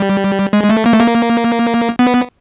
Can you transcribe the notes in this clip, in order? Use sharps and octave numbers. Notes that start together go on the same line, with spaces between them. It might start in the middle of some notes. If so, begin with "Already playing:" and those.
Already playing: G3
G#3
G#3
A3
A#3
A3
A#3
B3